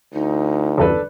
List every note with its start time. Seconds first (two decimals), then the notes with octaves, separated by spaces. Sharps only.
0.14 D2 D#4
0.78 G1 E2 C#3 D4 A4 B4